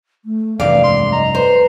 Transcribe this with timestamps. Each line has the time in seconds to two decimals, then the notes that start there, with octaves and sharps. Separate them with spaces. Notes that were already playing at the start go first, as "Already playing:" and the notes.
0.24 A3
0.60 F1 C2 G2 E3 D5 F5
0.84 G#3 C6
1.12 D#5 A#5
1.35 B4 C5